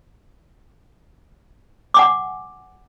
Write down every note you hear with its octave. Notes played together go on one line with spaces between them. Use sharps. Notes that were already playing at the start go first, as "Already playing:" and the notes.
F#5 G#5 D6